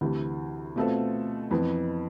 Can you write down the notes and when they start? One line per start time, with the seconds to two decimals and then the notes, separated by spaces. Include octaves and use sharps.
0.01 D2 C3 E3
0.76 B2 A3 C4 F4 A4
1.50 F2 E3 B3